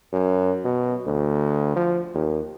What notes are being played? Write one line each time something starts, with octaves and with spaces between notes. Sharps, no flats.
F#2
B2
D2
F3
D#2